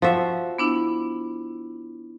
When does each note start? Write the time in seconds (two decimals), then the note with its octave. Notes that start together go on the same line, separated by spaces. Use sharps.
0.02 F3 F#4 E5
0.59 B3 D4 E4